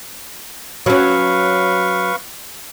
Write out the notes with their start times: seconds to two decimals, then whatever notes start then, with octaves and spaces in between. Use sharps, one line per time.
0.86 F#3 C#4 B4 F5 C#6